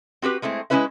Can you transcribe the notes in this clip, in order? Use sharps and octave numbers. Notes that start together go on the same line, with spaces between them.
C4 F#4 G4 B4
G#3 A3 C4 E4
G#3 A3 C#4 E4 B4 E5